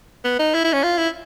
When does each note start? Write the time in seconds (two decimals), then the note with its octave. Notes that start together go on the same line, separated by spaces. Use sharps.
0.25 B3
0.39 D#4
0.54 E4
0.64 E4
0.73 C#4
0.83 F4
0.98 E4